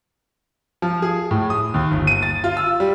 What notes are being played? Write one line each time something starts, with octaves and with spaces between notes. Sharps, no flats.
F3
G#4
A2
D#6
D#2
G1
D#7
A6
F4
E6
G3